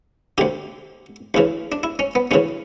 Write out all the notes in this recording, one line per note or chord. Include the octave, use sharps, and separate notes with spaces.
D2 D3 G4
D2 C#3 E3
D4
E4
C#4
B3
D2 C#3 E3 C#4